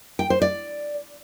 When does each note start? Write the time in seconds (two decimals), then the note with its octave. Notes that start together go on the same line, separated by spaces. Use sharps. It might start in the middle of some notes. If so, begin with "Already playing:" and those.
0.19 G5
0.30 C5
0.42 D5